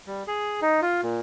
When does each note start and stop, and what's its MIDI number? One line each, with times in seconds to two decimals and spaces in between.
0.07 0.23 55
0.27 0.60 68
0.62 0.80 63
0.82 1.01 65
1.03 1.20 46